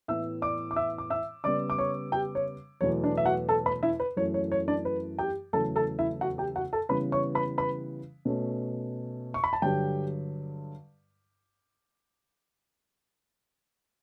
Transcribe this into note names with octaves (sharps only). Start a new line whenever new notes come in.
A2 E3 B3 E5 E6
D5 D6
D6
E5 E6
D6
E5 E6
C#3 G3 B3 D5 D6
D6
C#5 C#6
G4 G5
C#5
E2 B2 F#3 A3 C#5
D4 D5
E5
F#4 F#5
A4 A5
B4 B5
E4 E5
B4
F#2 E3 A3 C#5
C#5
C#5
D4 D5
B4
G4 G5
E2 C#3 F#3 A3 A4 A5
A4 A5
E4 E5
F#4 F#5
G4 G5
F#4 F#5
A4 A5
C#3 E3 G3 B3 B4 B5
C#5 C#6
B4 B5
B4 B5
B2 A3 C#4
C#6
B5
A5
G2 D3 F#3 G4 G5